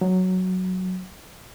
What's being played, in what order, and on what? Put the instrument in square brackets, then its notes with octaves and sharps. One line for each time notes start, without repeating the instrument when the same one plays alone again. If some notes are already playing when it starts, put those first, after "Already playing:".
[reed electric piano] F#3